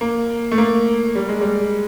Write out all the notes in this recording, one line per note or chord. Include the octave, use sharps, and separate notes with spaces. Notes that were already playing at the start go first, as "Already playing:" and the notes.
A#3
A3
A#3
G3
G#3
G3